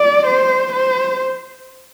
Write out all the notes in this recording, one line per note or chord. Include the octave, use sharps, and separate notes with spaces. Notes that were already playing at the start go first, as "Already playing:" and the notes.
Already playing: D5
C5
C5